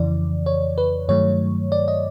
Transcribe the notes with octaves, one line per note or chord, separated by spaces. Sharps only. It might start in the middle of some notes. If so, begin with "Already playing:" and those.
Already playing: F2 C#3 E3 D5
C#5
B4
G2 D#3 F#3 A3 C#5
D5
D#5